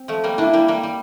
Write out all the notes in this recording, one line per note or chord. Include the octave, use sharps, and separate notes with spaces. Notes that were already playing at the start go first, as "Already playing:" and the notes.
Already playing: C4
F3 A3
G3 A#3
A#3 D4 E4
G3 A#3
G3 A#3
G3